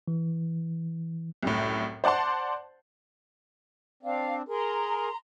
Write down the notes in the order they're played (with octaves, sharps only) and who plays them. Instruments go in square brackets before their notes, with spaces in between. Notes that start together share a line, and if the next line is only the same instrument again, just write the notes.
[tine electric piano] E3
[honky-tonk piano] C2 F#2 A2
C5 D5 F#5 A5 C6
[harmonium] C4 D4 [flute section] F5
[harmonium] G#4 A#4 [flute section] A#5 C6